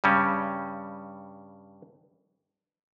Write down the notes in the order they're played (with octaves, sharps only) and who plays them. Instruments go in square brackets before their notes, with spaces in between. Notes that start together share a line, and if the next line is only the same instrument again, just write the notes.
[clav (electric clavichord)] G2 C#3 G3 C#4